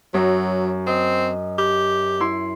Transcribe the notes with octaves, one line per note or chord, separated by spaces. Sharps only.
F#2 F#3
C4 D#5
G4
E4 C6